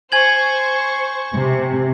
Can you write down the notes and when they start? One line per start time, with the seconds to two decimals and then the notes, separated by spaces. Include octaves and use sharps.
0.12 C5 G#5 C#6 G#6 F#7
1.34 C3